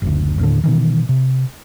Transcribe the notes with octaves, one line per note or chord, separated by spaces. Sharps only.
F#1 D2
D#2 A2 D3
B2 D#3 E3
C3